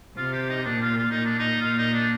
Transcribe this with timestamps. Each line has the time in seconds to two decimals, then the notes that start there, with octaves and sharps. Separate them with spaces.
0.18 C3 F4
0.33 G4
0.50 D#4
0.65 A#2 D4
0.81 F4
0.98 F4
1.11 A#2 D#4
1.26 D4
1.39 D#4
1.61 A#2 F4
1.78 D#4
1.93 D4